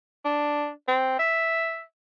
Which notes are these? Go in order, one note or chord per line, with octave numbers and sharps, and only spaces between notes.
D4
C4
E5